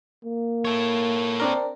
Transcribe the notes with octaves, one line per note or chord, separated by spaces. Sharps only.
A#3
A4 C#5
C4 D4 A#4